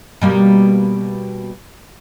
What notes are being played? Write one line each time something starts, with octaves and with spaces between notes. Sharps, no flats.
B2 G3 A#3